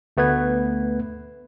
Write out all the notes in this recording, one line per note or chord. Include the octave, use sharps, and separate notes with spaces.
D2 A3 B3 B4 G#6